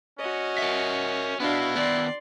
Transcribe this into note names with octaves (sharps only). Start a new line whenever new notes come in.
C#4 F#4 D#5
A#4 E5
B3 D4 E4 F#4 F5
D#3 B3 D5 C6